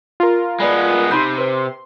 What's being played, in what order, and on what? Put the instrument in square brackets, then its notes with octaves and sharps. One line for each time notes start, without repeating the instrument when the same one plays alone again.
[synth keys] F4 A#4
[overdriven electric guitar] G#3 B3 [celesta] B4 D5 B5
[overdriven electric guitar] C3 [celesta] D#4 B5 G6 [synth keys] C6
[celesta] B4 C5